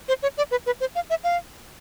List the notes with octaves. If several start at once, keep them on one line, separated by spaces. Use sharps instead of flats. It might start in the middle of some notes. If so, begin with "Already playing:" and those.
C5
C#5
D5
B4
B4
C5
F5
E5
F5